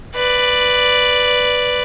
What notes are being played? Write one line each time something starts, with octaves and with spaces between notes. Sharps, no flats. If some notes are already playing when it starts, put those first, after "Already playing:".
B4 D5